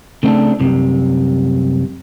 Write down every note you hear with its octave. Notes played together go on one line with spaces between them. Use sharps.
C#3 A3 C4 D4
C2 F#2 C3